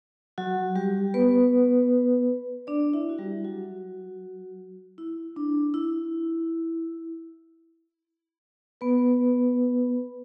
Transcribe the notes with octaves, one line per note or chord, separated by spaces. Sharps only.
F#3 F#4
G3 G4
B3 B4
D4 D5
E4 E5
F#4
G3 G4
F#3 F#4
E4
D4
E4
B3 B4